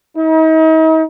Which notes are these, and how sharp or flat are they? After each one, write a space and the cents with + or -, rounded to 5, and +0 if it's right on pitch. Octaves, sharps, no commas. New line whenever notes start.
D#4 +40